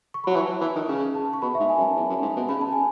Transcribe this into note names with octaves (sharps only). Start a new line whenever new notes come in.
C#6
F#3 B5
E3 A5
E3
D#3
C#3 C#6
A5
C#6
B2 B5
G#2 E5
G#5
F#2
A5
E2
F#2
G#2
B2
C#3 B5
A5
C#3
G#5